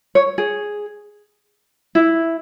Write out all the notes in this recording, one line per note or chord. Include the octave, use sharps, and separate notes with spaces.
C#5
G#4
E4